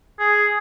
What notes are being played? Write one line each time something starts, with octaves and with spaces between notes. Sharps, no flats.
G#4